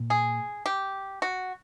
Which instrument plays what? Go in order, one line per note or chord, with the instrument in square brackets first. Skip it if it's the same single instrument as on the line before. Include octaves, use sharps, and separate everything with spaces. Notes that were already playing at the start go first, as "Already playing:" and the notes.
Already playing: [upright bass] A#2
[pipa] G#4
G4
F#4